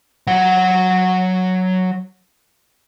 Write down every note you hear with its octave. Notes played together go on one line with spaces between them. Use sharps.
F#3 F#5